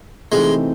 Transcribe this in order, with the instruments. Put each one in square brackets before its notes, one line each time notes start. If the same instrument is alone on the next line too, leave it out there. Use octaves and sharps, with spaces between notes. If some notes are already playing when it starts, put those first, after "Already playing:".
[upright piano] C3 E3 A3 C4 D#4 [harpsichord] G#3